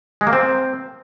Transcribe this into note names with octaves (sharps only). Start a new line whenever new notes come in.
G#3
A#3
C4